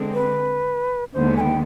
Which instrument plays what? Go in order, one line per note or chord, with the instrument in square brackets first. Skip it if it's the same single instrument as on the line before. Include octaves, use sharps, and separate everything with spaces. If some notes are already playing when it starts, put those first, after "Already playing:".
Already playing: [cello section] D3 G#3 C4
[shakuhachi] B4
[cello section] D#2 D3 G#3 B3 [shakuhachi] C5
[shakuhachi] G#5
G5